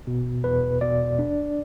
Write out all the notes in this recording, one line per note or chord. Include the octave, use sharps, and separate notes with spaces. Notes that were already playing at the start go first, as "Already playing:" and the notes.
B2
E2 B4
B2 D5
D4